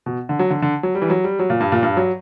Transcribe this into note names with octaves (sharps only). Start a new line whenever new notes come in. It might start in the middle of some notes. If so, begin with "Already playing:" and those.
B2
D3
F#3
D3
D3
F#3
G3
E3
F#3
G3
F#3
A#2
G2
A#2
G2
F#3